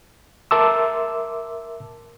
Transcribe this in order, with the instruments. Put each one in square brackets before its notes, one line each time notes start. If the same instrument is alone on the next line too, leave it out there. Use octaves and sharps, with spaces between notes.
[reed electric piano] A#4 E5 A5 C6 D6 E6